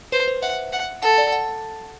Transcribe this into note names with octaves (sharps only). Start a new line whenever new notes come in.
B4 C5
C5
E5 F#5
F#5
A4 F#5
D5
F#5